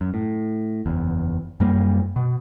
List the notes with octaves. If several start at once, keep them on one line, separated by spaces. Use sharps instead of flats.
F#2
A2
F#1 E2
F#2 G3 A#3
B2